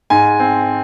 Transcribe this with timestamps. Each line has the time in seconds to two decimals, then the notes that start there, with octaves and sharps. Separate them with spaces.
0.10 G#2 G#5
0.40 C4